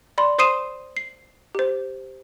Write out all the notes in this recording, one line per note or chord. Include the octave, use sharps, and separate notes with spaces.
D5 B5 C6
C5 C6 D#6 C7 D#7 E7
C7
G4 C5